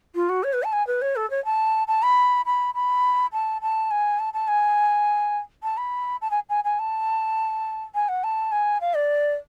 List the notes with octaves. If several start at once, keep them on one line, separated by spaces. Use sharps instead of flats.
F4
F#4
C#5
B4
A5
G#5
B4
C#5
A4
C#5
A5
A5
B5
B5
B5
A5
A5
G#5
A5
A5
G#5
A5
B5
A5
G#5
G#5
G#5
A5
G#5
F#5
A5
G#5
F5
D5